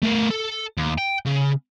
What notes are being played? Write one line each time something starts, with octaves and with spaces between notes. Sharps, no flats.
A3 A#4
A4
D#2
G5
C#3